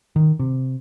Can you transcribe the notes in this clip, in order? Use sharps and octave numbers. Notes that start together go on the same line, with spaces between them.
D#3
C3